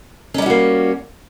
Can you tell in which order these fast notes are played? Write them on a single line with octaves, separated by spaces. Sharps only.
C#4 G3 E4 F#4 A#3